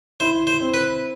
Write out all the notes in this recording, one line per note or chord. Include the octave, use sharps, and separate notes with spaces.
E4 C5
C5
C4
B4